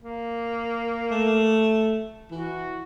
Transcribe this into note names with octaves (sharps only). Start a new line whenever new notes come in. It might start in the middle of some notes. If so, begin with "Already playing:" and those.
A#3
A3
E3 F#4